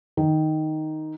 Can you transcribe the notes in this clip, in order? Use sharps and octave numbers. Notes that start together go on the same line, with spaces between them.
D#3